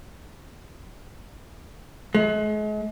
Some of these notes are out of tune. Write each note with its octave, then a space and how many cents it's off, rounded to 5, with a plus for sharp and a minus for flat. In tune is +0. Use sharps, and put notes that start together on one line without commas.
G#3 +40